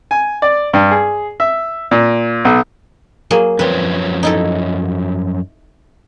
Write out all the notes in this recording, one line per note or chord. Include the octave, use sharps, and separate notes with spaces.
G#5
D5
G2
G#4
E5
A#2
B1
F#3 A#3 G#4
F#2 F3 C4 B4 C#5
D#4 E4 A4